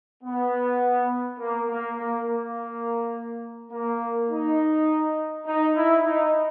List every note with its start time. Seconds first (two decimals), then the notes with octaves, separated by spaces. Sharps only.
0.23 B3
1.39 A#3
1.69 A#3
1.97 A#3
2.27 A#3
3.72 A#3
4.30 D#4
5.46 D#4
5.75 E4
6.05 D#4